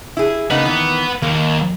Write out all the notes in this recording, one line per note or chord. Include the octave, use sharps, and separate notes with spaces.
E4 G#4
C#3 A#3 D#4 B4 F#5
D#3 E3
D#2 A#3